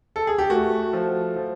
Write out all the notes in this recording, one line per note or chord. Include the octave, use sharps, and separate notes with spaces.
A4
G#4
G4
A3 F#4
F3
F3